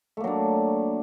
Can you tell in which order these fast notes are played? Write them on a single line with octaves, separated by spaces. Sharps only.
A3 A#3 F#3 D4